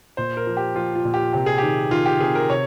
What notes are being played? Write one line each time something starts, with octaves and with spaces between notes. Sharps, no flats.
A#2 C5
A#4
F3
G4
F3 F4
F4
A#2
G4
C3 G4
G#4
D#3 G4
D#3 F4
G4
C3 G#4
A#4
C3 C#5